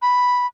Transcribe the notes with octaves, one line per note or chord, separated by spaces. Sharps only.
B5